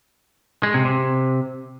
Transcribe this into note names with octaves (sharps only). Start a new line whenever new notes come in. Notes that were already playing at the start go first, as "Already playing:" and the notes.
G#3
C3
C3